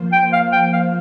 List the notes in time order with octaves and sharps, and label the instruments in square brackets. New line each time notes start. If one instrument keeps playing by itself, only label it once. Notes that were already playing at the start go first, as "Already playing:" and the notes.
Already playing: [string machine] F3 A#3 F4 C5
[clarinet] G5
F5
G5
F5